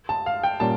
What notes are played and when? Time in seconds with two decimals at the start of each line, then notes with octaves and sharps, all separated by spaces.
0.09 A5
0.26 F5
0.43 G5
0.60 A#2 G3 C#4 A5